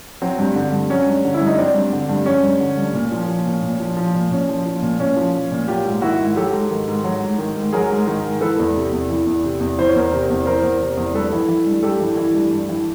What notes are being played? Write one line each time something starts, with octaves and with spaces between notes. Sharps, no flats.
F#3 C4
G2
D3
G2
F#3 C#4
G2
D3
E4
G2
D#4
F#3 C4 D4
G2
D3
G2
F#3 C#4
G2
D3
G2
A#2
F3
F3
A#2
A#2
F3
F3
A#2
A#2 C#4
F3
F3
A#2
A#2 C#4
F3
F3
A#2
F#3 F4 G4
G#2
D#3 E4 F#4
G#2
F#3 G4 A4
G#2
D#3
G#2
F#3
G#2
D#3
G#2
F#3 G#4 A#4
G#2
D#3
G#2
E3 A4 B4
E2
C3
E2
E3
E2
C3
E2
E3 C5
C#5
E2 A#4 C5
C3
E2
E3 A#4 C5
E2
C3
E2
G2 A4 B4
E3
E3
G2
G2 G4 A4
E3
E3
G2
G2
E3